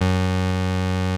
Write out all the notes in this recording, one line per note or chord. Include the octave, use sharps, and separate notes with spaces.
F#2